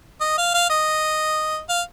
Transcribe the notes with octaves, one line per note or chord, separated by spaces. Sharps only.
D#5
F5
F5
D#5
F5